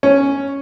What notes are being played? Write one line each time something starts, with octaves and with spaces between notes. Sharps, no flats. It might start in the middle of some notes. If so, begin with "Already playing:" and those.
C#4